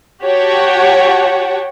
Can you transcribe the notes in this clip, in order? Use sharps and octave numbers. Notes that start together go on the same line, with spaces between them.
F#4 G4 C#5 F#5 G5 A5